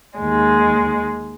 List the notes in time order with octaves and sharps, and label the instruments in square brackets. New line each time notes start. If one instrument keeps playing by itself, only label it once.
[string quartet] D#2 G#3